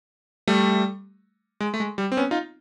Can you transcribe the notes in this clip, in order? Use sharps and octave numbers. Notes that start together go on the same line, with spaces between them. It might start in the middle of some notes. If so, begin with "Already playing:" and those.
G3 A3
G#3
A3
G#3
G3
C4
B3 C#4
D#4 F4